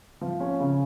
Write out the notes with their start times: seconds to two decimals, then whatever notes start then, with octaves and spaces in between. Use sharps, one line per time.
0.21 F3
0.40 C#4
0.60 C#3